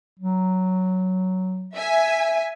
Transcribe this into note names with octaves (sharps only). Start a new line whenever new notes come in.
F#3
E5 G#5